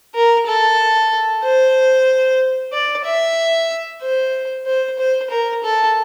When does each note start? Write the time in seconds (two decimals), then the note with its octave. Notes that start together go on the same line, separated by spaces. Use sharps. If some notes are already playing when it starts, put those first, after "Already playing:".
0.15 A#4
0.47 A4
1.43 C5
2.73 D5
3.05 E5
4.02 C5
4.66 C5
4.99 C5
5.30 A#4
5.64 A4